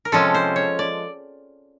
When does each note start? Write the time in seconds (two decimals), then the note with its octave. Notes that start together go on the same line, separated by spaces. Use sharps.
0.05 A#4
0.12 C3 F3 G#3 C#4 A4
0.34 C5
0.56 C#5
0.79 D5